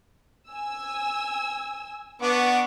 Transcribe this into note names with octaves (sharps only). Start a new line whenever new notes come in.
G#5 E6
B3 D4 F#5 C#6 D6